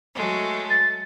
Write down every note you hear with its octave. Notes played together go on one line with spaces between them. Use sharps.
F#3 G#3 A3
A6